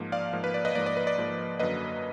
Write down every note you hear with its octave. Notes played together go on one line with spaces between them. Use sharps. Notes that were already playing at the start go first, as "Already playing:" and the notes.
Already playing: G#2 F3 A#3
D5 F5
G#2 F3 A#3
B4
D5
B4 D#5
G#2 F3 A#3 D5
D5
B4
D5
G#2 F3 A#3
F#2 D3 F#3 A#3 B4 D#5